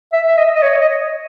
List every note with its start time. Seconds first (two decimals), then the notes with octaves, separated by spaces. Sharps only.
0.13 E5
0.28 E5
0.37 D#5
0.56 D#5
0.62 C#5
0.81 D#5